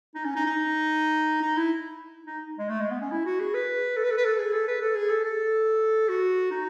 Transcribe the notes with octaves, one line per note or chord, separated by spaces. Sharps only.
D#4
C#4
D#4
D#4
D#4
E4
D#4
G#3
A3
G#3
B3
C#4
E4
F#4
G#4
B4
A4
B4
A4
B4
A4
G#4
A4
B4
A4
G#4
A4
A4
F#4
D#4